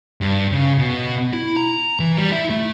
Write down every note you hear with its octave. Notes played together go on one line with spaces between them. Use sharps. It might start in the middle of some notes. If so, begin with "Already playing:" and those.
G2
C#3
B2
E4
A#5
E3
G3
E4
A3